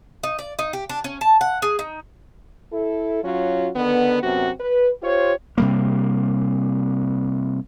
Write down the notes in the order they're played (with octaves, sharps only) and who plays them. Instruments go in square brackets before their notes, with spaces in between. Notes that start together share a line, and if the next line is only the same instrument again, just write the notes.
[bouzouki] D#4
D5
D#4
G4
D4
C#4
A5
F#5
G#4
D#4
[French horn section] E4 A4
F#3 C#4 F4 F#4
D3 D#3 B3
F#2 C3 B3 C4 F#4
B4
F4 G4 C5 C#5
[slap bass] C3 G3 A#3